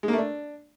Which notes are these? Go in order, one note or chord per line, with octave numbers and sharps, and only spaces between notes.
G#3
A#3
A3
D4